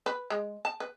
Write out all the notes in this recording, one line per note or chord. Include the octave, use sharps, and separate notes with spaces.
B4
G#3
A5
B4